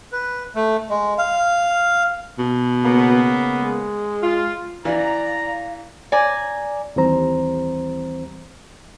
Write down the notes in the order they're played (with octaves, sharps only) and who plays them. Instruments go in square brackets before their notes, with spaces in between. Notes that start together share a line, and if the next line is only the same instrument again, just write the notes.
[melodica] B4
A3
G#3
F5
[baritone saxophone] B2
[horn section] C#3 A#3 B3
[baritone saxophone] G#3
[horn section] F4
[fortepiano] E3 [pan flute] D5 [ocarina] F5 [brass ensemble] A#5
[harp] D5 G#5 A#5
[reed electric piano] D#2 E3 G3 C4 C5 A#5